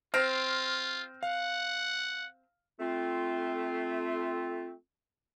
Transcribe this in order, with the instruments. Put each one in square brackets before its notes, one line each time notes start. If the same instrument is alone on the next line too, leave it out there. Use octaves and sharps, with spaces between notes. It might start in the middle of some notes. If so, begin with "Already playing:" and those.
[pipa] C4 [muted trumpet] F4 [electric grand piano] F6 A#6 D7
[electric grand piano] F5 [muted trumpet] F#5
[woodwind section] A3 C4 F4